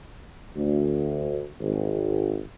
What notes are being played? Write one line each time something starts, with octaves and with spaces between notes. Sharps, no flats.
D2
G#1